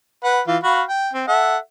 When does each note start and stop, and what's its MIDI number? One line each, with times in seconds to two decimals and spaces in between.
0.24 0.41 71
0.24 0.41 78
0.47 0.57 52
0.47 0.57 65
0.64 0.83 66
0.64 0.83 77
0.64 0.83 83
0.88 1.11 79
1.13 1.27 60
1.28 1.57 69
1.28 1.57 76
1.28 1.57 78